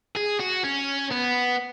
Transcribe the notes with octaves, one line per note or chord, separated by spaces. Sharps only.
G#4
F#4
C#4
B3